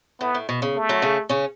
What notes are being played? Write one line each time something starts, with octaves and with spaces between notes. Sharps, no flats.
A2 B3
A2
B2
C#3
A3
F#2 F#3
C#3 C#4
C#3 C#4